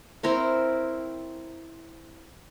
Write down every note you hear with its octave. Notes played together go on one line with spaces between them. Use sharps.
C4 E4 A#4 C#5